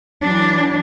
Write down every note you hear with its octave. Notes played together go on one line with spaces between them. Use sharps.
E3 F#3 D4